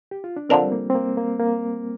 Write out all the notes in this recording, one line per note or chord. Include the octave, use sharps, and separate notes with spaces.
G4
F4
D4
D3 F3 C4 D4 A#4
G3
A#3
C4
A#3
A#3
A#3